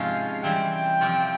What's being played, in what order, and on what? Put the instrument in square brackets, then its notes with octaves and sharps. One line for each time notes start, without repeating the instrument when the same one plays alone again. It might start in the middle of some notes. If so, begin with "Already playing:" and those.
Already playing: [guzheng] G#2 C3 F3 G#3 C#4 F4 [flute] F5
[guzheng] E3 G3 C4 E4 [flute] G5
[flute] G5
[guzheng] F2 C3 F3 C4 F4